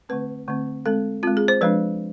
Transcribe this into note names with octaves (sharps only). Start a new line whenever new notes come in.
D3 A3 C4 B4
D3 A3 C4
G#3 C4 A4
G#3 C4 F4
G#4
C5
F3 G#3 D4 B4